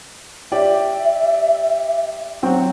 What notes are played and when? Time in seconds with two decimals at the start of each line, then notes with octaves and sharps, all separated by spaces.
0.52 G4 D5 E5
2.43 F#3 C4 F#5 G5